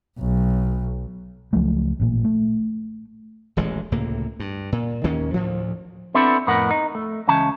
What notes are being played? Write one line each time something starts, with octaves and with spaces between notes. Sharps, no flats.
B1
C#2 F3 F#3 A3
A1 A#2
A3
D#1 A1 E3 G#3
C#2 A2 C3 A#3
G2
A#2
D#2 D#3 A#3 C#4
D2 A2 F3
B3 C4 D4 E4 A4
F2 A2 B3 A#4 F#5
D#4
A3
C#2 E3 C#4 A5